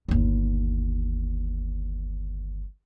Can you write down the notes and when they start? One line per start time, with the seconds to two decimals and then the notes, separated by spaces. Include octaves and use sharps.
0.08 G1 D#2